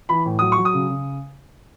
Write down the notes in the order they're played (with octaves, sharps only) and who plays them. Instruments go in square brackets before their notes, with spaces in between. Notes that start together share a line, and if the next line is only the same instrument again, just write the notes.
[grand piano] E3 B5
A2
F#3 D#6
C#6
F#3
D#6
C#3
C#3